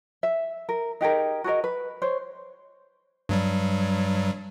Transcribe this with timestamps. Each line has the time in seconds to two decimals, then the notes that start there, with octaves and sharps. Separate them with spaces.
0.23 E5
0.69 A#4
1.01 D#4 G4 G#4 A#4
1.44 F#4 G#4 A#4 D#5
1.64 B4
2.02 C5 C#5
3.29 G2 F#3 G3